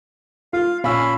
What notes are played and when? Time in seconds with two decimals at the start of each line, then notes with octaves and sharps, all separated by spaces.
0.53 F4 F5
0.84 A#1 C#4 F5 B5 E6